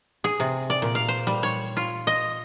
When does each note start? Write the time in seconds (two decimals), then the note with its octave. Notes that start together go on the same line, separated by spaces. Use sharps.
0.24 G#4
0.40 C3
0.70 D5
0.82 A#2
0.95 F5
1.08 C5
1.27 G3
1.43 C#5
1.77 F4
2.07 D#5